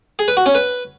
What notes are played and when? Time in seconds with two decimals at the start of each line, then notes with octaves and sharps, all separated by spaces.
0.19 G#4
0.28 B4
0.37 F#4
0.46 C#4
0.55 B4